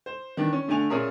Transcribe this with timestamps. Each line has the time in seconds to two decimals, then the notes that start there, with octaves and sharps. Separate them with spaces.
0.06 C5
0.37 D#3 E3 D4
0.53 C#4
0.68 D3 A3 D4 G#5 F7
0.90 A#2 C#4 G#4 A#4 E5